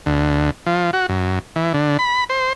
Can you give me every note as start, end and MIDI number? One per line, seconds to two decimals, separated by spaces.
0.06 0.50 38
0.66 0.91 53
0.93 1.06 66
1.09 1.39 42
1.56 1.73 52
1.74 1.97 50
1.99 2.24 83
2.29 2.53 72